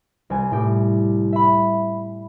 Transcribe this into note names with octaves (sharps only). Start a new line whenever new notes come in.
C2 G#5
A2 G4
E5 B5